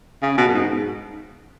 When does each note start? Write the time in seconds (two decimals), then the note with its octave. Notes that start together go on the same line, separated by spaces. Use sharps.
0.23 C#3
0.38 B2
0.48 F#2
0.54 G#2